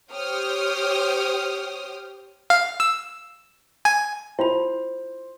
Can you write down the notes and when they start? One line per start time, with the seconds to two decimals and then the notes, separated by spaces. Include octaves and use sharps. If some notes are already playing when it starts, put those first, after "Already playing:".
0.13 G4 C5 C#5 G5 D#6 F6
2.50 F5
2.80 E6
3.85 G#5
4.39 E4 F4 C5 B5